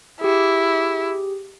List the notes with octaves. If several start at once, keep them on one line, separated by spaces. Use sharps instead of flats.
E4 G4 G#4